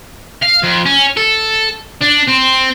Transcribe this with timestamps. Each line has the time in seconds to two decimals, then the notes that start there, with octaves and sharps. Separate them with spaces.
0.42 F5
0.63 F2
0.86 C#4
1.17 A4
2.01 D4
2.27 C4